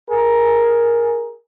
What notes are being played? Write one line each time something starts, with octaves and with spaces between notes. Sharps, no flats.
G#4 A#4